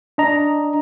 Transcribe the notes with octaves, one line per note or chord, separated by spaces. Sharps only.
D4 D#5 A#5